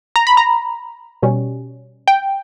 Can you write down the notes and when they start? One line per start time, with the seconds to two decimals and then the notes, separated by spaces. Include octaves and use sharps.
0.16 A#5
0.27 B5
0.37 A#5
1.22 B2 G3 C#4
2.08 G5